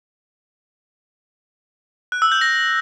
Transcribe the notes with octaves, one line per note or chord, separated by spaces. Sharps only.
F#6
E6
G6
A#6